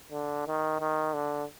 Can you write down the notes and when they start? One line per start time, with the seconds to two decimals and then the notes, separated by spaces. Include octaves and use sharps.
0.11 D3
0.47 D#3
0.80 D#3
1.14 D3